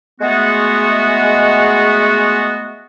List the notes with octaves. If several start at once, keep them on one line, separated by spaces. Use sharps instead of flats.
G#3 A3 B3 F#4